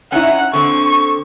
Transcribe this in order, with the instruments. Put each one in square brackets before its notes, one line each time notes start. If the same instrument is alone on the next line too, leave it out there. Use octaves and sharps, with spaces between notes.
[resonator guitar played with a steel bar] C#4 D#4 E4 [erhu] F#5
[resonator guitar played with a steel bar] D3 C4 [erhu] C#6